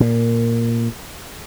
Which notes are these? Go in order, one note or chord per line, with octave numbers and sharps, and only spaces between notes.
A#2